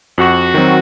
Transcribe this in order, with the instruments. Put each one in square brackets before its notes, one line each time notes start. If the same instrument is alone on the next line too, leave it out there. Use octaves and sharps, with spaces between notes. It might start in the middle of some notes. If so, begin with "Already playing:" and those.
[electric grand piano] F2 [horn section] F#4
[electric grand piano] D#3 F#3 C4